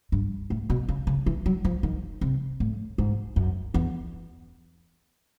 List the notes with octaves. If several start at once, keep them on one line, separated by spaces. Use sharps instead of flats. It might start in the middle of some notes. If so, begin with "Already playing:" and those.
G2
A2
B2
C#3
C#3
E3
F#3
F3
D#3
C3
A2
G#2
F#2
E2